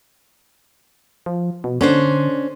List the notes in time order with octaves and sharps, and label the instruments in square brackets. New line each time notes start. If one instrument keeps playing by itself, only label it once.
[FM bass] F3
B2
[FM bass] D3 [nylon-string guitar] C#4 D4 C5